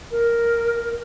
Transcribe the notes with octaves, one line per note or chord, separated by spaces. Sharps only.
A#4